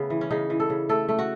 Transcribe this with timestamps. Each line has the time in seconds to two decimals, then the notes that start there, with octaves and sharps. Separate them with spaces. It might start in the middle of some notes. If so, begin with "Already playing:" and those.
Already playing: C#3 A3 B3
0.10 E3
0.21 C#4
0.30 C#3 D#4
0.50 E3
0.60 A4
0.70 C#3
0.89 A3 A4
1.09 A3
1.19 F#4